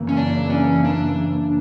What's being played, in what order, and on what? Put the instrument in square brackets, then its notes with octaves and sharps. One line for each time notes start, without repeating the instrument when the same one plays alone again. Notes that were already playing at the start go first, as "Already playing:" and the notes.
Already playing: [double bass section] F#2 C#3 E3 A#3
[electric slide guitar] C#4
D4
C#4
D4